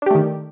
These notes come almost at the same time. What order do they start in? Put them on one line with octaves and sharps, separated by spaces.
D4 G4 A3 D#3